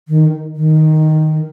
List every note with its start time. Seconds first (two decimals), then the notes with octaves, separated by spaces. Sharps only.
0.08 D#3
0.56 D#3